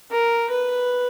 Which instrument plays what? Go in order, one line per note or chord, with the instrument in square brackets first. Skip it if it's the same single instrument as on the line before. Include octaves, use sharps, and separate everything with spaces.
[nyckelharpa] A#4
B4